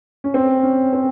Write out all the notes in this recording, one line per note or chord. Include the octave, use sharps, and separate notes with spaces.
C#4
C4
C#4
C4